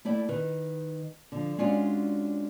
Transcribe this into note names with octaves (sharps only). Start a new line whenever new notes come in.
A3 E4 D5 G5
D#3 B4
D3 F3
G#3 C#4 D4 F4 F#4 D5